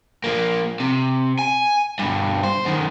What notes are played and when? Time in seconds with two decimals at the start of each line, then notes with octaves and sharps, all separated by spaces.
0.24 F3 A#3
0.80 C3
1.39 G#5
1.99 G2 B2
2.43 C5
2.65 F#2 D#3